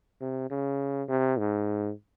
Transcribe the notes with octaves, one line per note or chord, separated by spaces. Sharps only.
C3
C#3
C3
G#2